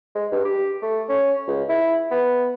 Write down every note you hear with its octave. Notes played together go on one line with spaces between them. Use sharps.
G#3
G2
G4
A3
C#4
C#2
E4
B3